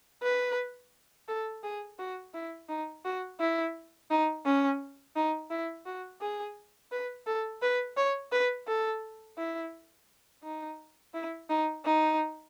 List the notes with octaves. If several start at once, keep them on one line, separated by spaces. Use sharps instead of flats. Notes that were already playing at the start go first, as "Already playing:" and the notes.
B4
A4
G#4
F#4
E4
D#4
F#4
E4
D#4
C#4
D#4
E4
F#4
G#4
B4
A4
B4
C#5
B4
A4
E4
D#4
E4
D#4
D#4